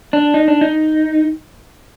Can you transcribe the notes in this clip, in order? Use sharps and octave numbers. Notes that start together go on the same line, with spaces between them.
D4
D#4
D4
D#4